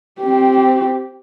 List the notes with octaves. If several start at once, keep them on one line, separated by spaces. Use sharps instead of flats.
C4 G4